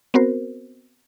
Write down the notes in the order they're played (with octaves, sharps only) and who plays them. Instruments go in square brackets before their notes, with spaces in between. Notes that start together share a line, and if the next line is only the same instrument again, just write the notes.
[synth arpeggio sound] B3 C4 F#4 A#4 C5